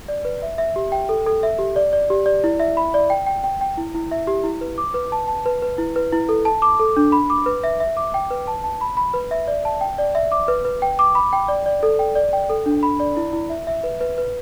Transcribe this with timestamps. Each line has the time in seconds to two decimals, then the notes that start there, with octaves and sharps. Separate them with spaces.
0.08 D5
0.25 B4
0.42 E5
0.58 E5
0.76 G4
0.92 G5
1.09 A4
1.26 A4
1.43 E5
1.59 G4
1.76 D5
1.93 D5
2.10 G4
2.26 D5
2.44 E4
2.60 E5
2.77 B5
2.94 D5
3.10 G5
3.26 G5
3.44 G5
3.61 G5
3.77 E4
3.95 E4
4.11 E5
4.27 G4
4.44 E4
4.61 B4
4.78 D6
4.94 B4
5.12 A5
5.28 A5
5.46 B4
5.62 B4
5.78 E4
5.96 B4
6.12 E4
6.29 A4
6.45 A5
6.62 D6
6.79 A4
6.97 D4
7.12 B5
7.30 D6
7.46 B4
7.64 E5
7.80 E5
7.97 D6
8.14 G5
8.31 B4
8.47 A5
8.64 A5
8.81 B5
8.97 B5
9.14 B4
9.31 E5
9.48 D5
9.65 A5
9.81 G5
9.98 D5
10.15 E5
10.32 D6
10.48 B4
10.65 B4
10.82 G5
10.99 D6
11.15 B5
11.33 G5
11.48 D5
11.66 D5
11.83 A4
11.99 G5
12.15 D5
12.33 G5
12.49 A4
12.66 D4
12.83 B5
13.00 D5
13.17 E4
13.33 E4
13.50 E5
13.67 E5
13.84 B4
14.01 B4
14.18 B4